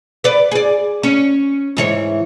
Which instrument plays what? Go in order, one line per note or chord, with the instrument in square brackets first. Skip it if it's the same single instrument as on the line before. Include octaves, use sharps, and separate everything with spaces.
[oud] B4 D5
G#4 D5
C#4
G#2 E3 C#5